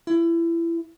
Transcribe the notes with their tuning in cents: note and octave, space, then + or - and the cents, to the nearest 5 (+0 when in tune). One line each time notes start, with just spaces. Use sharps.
E4 +25